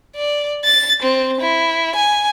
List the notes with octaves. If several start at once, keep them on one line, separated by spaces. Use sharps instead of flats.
D5
A6
C4
E4
G#5